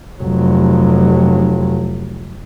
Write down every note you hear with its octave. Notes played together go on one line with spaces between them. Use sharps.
F1 F#3